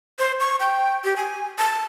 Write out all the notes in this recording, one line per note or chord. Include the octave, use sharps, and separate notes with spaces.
C5
C#6
G5
G4
G#5
A5